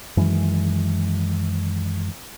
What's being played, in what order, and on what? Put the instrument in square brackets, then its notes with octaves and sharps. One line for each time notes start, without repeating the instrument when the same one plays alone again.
[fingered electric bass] F#2 D#3 E3 G#3